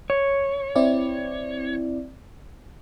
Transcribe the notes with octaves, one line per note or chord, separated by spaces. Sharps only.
C#5
C4 E4 D5